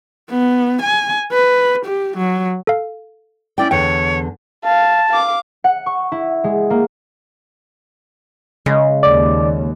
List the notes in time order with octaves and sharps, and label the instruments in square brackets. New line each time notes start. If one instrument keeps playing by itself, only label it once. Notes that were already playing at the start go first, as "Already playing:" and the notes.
[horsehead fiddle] B3
G#5
B4
G4
F#3
[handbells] A4 F5
[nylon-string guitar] C#4 E4 G5 [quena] D5
[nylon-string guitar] E2 D3 [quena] C#5 [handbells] G5
[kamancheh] F5 [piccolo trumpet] A5
[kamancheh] F5 D6
[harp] F#5
C#6
E4
G#3
A#3
[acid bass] C#3 [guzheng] G#3
[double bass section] D#2 [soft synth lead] D5